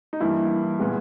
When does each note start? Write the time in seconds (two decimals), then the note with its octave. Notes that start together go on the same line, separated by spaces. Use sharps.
0.13 D#4
0.20 G2 E3 A#3 E4
0.79 A#2 G#3 B3